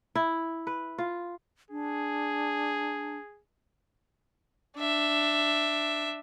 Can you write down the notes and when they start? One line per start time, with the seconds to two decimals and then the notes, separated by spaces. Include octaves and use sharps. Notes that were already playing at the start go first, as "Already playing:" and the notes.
0.15 E4
0.67 B4
0.98 F4
1.71 D4 G#4
4.77 D4 E5